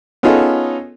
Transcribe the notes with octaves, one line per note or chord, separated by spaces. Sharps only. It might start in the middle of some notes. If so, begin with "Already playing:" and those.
B3 C#4 D#4 F4 G#4 A4